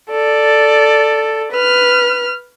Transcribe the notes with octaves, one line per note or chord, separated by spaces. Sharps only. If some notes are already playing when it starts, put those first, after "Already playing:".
A4 D5
B4 F6